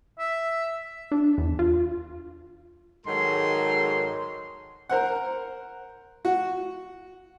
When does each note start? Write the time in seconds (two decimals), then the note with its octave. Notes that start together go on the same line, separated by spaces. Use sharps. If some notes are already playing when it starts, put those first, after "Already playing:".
0.19 E5
1.12 D4
1.38 E2
1.59 F4
3.06 G#2 D#3 F#3 G#3 A4 C6
4.89 A#4 C5 F#5
6.25 F#4